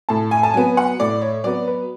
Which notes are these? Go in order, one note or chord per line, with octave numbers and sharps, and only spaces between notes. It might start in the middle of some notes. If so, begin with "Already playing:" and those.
A2 A5
G#5
A5
F#3 B3 G#5
F#5
A2 D5
C#5
F#3 B3 D5
B4